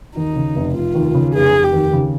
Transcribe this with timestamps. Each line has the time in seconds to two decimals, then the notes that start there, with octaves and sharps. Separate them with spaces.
0.16 D#2 D#4
0.36 C#3
0.55 F1
0.75 F1 F4
0.95 D#2
1.15 C#3
1.34 F1 G#4
1.54 F1
1.64 G4
1.73 D#2
1.93 C#3